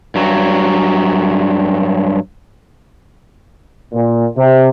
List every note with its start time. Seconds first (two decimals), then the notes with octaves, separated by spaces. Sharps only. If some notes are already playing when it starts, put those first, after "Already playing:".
0.15 G2 F#3
3.93 A#2
4.37 C3